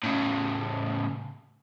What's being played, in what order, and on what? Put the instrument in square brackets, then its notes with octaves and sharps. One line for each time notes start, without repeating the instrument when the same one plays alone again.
[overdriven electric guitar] A2 C#3